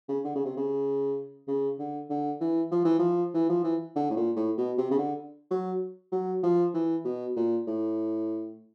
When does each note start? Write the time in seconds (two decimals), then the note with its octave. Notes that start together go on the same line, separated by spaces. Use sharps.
0.09 C#3
0.25 D3
0.36 C#3
0.45 C3
0.57 C#3
1.48 C#3
1.79 D3
2.10 D3
2.41 E3
2.71 F3
2.85 E3
2.99 F3
3.34 E3
3.49 F3
3.64 E3
3.96 D3
4.10 A2
4.16 A#2
4.37 A2
4.58 B2
4.78 C3
4.91 C#3
4.99 D3
5.51 F#3
6.12 F#3
6.43 F3
6.74 E3
7.05 B2
7.36 A#2
7.67 A2